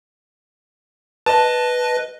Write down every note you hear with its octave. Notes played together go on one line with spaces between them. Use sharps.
B4 D#5 A5